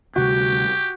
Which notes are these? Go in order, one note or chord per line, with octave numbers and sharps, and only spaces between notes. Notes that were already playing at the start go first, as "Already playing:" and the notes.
D2 C3 G3 F#4 G4